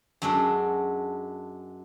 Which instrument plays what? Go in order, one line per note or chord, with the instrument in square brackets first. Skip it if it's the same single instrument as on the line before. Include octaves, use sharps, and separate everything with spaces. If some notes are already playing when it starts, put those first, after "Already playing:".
[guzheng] F#2 G#3 D4 F#4 A4